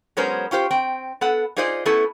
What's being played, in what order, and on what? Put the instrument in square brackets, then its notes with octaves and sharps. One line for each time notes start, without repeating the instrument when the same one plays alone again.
[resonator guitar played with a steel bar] F#3 G#3 B3 C#4 A#4 C5
C#4 F4 G4 C5
C4 G5
B3 A4 F#5
D#4 F4 G#4 C5 D5 D#5
A3 B3 C#4 E4 A4